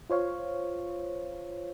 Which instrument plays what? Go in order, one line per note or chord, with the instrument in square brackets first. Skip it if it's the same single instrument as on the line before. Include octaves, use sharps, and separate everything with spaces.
[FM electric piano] F4 C5 C#5 F5